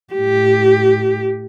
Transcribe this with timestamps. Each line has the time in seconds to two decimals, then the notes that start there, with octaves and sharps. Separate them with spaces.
0.14 A2 G4